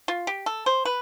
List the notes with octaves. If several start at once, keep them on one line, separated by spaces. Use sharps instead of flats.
F4
G4
A4
C5
B4